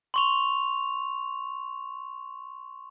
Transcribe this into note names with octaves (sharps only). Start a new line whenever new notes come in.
C6 C#6 F7